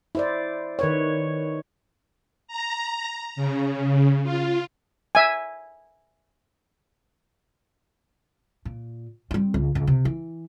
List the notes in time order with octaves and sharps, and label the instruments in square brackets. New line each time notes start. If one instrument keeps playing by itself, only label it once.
[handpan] E4 C5 D5
D#3 B4 C#5
[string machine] A#5
C#3
F4
[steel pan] E5 G#5
[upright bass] A#2
G3 C4
C#2
C#2
C3
E3